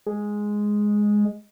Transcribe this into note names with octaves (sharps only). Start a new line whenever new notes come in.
G#3